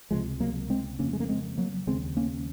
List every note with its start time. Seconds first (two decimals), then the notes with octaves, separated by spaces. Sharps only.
0.11 C#2 C3 F3 G#3
0.40 F#3 A#3
0.70 G#3 C4
0.99 F2 C#3 A#3 C#4
1.13 G#3
1.20 A#3
1.28 G#3 C4
1.58 F#3 A#3
1.87 D#2 C#3 G#3 C4
2.17 A#3 C#4